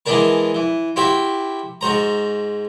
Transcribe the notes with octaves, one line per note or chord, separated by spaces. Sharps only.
E3 G#3 B3 D4 A#4 A5
E3
E4 F#4 G4 C5 E5
G#2 F#4 C5 A#5